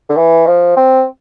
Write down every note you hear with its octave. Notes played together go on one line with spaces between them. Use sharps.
D3
E3
F3
C4